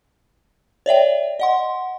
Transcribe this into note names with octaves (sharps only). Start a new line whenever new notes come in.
C#5 D5 E5 G5
D#5 F#5 C6